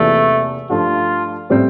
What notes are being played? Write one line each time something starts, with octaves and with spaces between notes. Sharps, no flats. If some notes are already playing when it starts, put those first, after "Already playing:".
Already playing: E2 C3 E3 A3 A#3 F4
G2 F3 A3 F4
A2 G3 C4